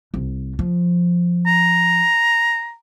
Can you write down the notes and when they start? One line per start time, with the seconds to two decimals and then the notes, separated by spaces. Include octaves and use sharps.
0.14 C2
0.59 F3
1.47 A#5